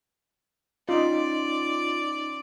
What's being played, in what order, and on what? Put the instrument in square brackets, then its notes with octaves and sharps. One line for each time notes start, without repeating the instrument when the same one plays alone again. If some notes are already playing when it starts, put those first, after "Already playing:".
[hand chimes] C#4 [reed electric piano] D#4 C6 [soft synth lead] F4 [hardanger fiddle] D5